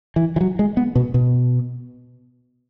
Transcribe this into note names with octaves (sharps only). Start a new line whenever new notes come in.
E3
E3
F#3
G#3
B3
B2
B2